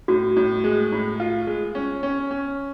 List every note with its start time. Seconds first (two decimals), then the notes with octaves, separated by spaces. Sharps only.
0.08 A2 F#4
0.37 A2
0.64 G#3
0.92 A2
1.20 F4
1.47 G#3
1.75 C#4
2.03 C#4
2.31 C#4